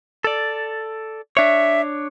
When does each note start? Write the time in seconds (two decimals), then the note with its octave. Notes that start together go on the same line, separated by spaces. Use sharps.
0.24 A4 D5
1.37 D4 C#5 E5